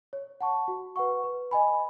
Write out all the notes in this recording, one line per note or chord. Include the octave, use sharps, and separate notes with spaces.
C#5
F#5 A5 C#6
F#4
B4 F#5 C#6
B4
D#5 G#5 B5